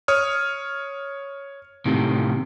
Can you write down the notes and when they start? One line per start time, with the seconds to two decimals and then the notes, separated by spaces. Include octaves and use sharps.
0.08 C#5 D#6 F6
1.85 A2 C3 D#3